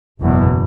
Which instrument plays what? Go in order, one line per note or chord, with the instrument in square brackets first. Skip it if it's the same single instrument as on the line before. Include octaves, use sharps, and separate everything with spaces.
[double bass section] F#1 E2 B2